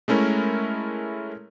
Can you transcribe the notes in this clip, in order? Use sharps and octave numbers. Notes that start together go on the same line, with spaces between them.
G#3 A3 C#4 E4 A#4